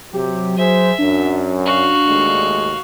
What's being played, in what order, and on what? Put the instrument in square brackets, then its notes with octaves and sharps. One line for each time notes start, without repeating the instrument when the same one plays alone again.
[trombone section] C3 G4 [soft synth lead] F#3
[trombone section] G#4 C5 [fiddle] E5
[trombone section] F#2 [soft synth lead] D4
[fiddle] F#4 F5
[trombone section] D#2 G#3 A3